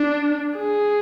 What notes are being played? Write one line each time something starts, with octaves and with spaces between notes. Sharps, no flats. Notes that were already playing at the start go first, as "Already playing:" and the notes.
Already playing: D4
G#4